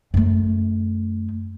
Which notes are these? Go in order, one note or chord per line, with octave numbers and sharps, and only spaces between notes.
F#2 A3